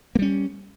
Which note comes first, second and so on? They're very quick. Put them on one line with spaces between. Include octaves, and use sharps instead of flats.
A#3 G3 C#4